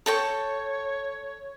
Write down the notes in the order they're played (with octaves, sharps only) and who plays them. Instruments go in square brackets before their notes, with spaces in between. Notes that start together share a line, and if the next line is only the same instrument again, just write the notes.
[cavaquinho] A4 G5 C#6 [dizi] C#5